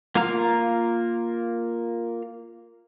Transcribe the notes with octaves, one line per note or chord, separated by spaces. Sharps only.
A#3 F4 F5 A#5 F6